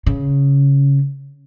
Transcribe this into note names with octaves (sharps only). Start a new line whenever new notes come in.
C#3